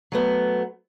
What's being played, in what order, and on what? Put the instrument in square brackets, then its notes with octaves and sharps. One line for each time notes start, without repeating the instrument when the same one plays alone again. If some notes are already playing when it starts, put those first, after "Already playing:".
[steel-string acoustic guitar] F#3 A3 B3